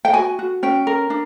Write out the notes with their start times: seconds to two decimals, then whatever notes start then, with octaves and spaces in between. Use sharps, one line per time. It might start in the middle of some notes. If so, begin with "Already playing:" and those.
0.05 G5
0.13 F#4 G#5
0.39 F#4
0.63 C#4 G5
0.87 A#4
1.10 D4